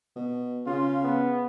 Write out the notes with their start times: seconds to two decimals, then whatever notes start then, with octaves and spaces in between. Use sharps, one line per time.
0.16 B2
0.66 C#3 F4
1.04 B3